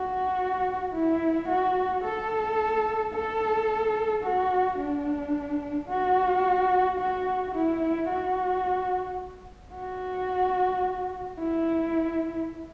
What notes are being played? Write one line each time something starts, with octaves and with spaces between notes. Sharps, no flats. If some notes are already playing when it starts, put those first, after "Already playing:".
Already playing: F#4
E4
F#4
A4
A4
F#4
D4
F#4
F#4
E4
F#4
F#4
E4